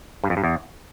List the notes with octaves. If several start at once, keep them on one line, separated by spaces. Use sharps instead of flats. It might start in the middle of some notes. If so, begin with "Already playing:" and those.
G2
F2
G2
E2